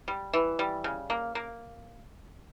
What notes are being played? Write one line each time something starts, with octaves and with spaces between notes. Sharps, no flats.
G3
E3
G3
C#3
A#3
A#3